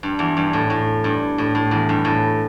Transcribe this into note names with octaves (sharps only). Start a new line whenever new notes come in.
G2
E2
G2
A2
A2
G2
A2
A2
E2
G2
A2